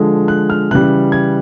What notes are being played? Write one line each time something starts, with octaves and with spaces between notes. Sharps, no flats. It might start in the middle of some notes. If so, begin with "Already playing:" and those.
Already playing: D3 F3 G#3
F#6
F6
C#3 E3 G3 F#6
G#6